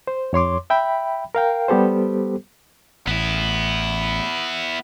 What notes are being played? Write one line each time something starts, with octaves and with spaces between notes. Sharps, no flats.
C5
F2 C#5 C6 D6
E5 G5 B5
A#4 F5 G5
G3 B3 G4 A4 C5
A1 B3 E4